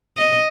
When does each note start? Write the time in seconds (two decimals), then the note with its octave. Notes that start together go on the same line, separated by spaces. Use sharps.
0.17 D#5